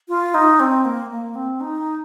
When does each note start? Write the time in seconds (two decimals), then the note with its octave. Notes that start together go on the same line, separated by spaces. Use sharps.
0.08 F4
0.34 D#4
0.60 C4
0.85 A#3
1.10 A#3
1.35 C4
1.61 D#4